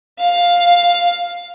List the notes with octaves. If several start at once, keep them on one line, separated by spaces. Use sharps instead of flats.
F5